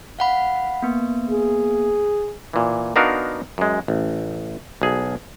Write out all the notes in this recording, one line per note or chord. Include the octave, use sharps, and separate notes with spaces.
F5 F#5 B5
A#3 B3
G#4
A#2 E3
B3 D4 D#4 F#4 A#4 F5
F#2 G#3
A1
B1 G#4